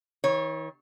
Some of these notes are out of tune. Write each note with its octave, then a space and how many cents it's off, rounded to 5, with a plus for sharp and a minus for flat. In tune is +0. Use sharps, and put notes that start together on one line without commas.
D#3 +45 C#5 -25